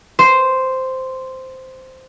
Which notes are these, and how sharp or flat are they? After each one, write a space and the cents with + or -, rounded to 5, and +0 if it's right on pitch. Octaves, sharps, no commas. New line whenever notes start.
C5 -5